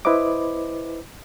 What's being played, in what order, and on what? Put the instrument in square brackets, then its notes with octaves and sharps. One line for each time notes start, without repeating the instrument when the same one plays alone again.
[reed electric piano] E4 B4 C5 D#5 D6